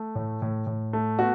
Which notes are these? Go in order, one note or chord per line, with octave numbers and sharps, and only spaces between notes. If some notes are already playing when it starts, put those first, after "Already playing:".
Already playing: A3
A2
A2
A2
A3
B3 F#4